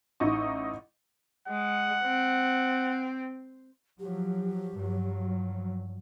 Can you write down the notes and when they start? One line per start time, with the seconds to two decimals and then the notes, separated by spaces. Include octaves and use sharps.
0.20 A1 D#4 E4 D#5 C#6
1.48 G#3 F#5
2.04 C4
4.00 F3 F#3 G4
4.73 G2 F3 F#3